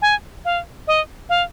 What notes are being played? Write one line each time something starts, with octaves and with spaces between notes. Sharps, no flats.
G#5
F5
D#5
F5